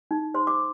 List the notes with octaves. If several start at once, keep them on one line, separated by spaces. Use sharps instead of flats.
D#4
C5 C6
D6